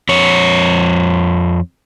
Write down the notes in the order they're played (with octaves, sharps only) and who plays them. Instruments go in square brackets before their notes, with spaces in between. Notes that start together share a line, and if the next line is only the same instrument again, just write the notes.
[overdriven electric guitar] F2 C#5